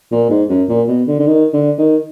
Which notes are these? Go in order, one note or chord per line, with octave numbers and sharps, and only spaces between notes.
A#2
G#2
F#2
A#2
B2
D3
D3
D#3
D3
D#3